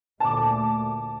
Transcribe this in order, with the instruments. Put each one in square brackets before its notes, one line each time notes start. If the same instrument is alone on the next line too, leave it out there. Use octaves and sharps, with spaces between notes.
[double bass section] D2 A#2 A3 [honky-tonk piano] A5 D6